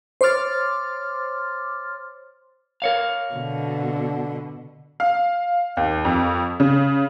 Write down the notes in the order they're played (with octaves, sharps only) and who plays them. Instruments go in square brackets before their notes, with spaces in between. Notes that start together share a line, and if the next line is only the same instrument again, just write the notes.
[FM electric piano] C5 C#5 C6 D6 F6 A6
[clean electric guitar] A#4 C#5 F5
[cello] B2 D3
[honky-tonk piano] F5
D#2
F2
C#3